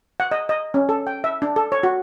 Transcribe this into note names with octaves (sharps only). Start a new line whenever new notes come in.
F#5
D#5
D#5
C#4
A4
G5
E5
D4
A4
C#5
F#4